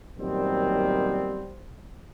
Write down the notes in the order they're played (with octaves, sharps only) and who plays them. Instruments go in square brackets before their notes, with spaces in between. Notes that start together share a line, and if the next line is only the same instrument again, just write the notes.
[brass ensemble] F#2 A#2 D#3 G3 B3 C4